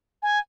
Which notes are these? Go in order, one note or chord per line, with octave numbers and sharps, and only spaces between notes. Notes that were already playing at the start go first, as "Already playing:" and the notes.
G#5